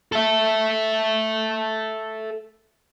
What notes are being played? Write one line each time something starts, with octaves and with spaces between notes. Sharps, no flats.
A4 E5